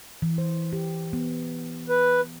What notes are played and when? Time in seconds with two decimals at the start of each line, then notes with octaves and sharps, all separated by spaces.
0.22 E3
0.38 C5
0.73 G4
1.13 B3
1.89 B4